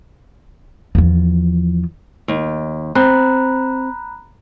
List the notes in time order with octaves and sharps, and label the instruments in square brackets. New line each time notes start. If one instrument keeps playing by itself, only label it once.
[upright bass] E2 F3
[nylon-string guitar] D#2
[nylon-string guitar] C4 [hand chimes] A#5 B5 F#6